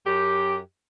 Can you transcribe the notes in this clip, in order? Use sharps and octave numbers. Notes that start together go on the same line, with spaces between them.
F#2 G4